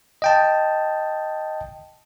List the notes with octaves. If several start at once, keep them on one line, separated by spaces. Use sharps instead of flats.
D#5 G5 A5